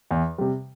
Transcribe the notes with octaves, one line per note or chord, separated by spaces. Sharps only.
E2
C3 G3